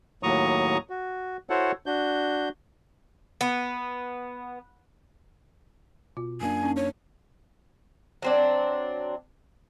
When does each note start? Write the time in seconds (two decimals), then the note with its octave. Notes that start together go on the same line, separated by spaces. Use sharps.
0.23 D#2 A2 F#3 A#5 C#6 D#6
0.90 F#4
1.50 E4 F#4 A4 C5 C#5 F#5
1.86 D4 F#4 G6
3.41 B3
6.17 B2 F4
6.41 F#2 A#3 D4 G#5
6.63 C#4 D#4 A5
6.76 C#5
8.22 F#3 C4 D4